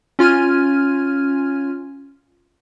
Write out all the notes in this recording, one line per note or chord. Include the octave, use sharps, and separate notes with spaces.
C#4 F4 F6 G#6 D#7